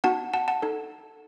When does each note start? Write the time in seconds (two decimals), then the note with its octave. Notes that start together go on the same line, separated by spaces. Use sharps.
0.04 B3 D#4 F#4 F#5 A5
0.34 F#5 A5
0.48 F#5 A5
0.62 D#4 A4